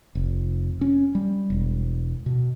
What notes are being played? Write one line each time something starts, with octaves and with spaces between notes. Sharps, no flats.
F1
C#4
G3
E1
B2